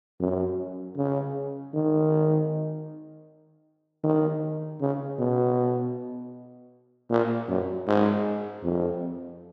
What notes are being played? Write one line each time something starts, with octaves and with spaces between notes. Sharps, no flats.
F#2
C#3
D#3
D#3
C#3
B2
A#2
F#2
G#2
F2